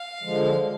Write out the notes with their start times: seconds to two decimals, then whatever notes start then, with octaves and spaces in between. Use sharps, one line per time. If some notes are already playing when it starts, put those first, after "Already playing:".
Already playing: F5
0.23 D3 F3 G#3